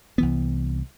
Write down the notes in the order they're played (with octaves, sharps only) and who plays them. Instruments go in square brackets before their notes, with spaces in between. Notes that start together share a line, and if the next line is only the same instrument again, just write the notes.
[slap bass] C2 E3 B3